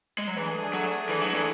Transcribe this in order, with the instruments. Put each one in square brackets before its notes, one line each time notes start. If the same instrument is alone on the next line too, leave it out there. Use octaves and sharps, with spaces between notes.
[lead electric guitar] G#3
F#3
[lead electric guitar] E3 [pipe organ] A3 D4 G#4
[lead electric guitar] F#3
E3
F#3
E3